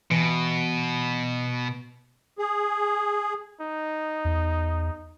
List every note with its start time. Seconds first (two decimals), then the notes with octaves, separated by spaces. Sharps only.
0.11 B2 E3 C#7 D7
2.39 G#4
3.61 D#4
4.25 E2